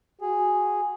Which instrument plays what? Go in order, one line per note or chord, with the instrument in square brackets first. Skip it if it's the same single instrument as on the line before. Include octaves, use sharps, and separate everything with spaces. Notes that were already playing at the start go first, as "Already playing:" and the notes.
[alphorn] F#4 [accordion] G#4